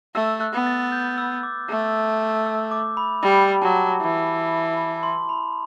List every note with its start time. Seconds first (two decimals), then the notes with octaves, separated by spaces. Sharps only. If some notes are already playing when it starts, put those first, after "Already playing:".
0.15 A3 E6
0.41 F#6
0.54 B3
0.66 A6
0.92 G6
1.18 E6
1.43 D6
1.69 A3 E6
2.46 E6
2.71 D6
2.97 B5
3.23 G3 B5
3.62 F#3 A5
4.01 E3
4.77 B5
5.03 C6
5.29 B5